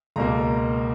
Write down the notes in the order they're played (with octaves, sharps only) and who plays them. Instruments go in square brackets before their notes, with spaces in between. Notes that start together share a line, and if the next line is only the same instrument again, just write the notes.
[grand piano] C#2 B2 A#3 A#5